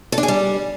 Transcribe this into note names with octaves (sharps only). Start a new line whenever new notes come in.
A4
D4
G#4
G3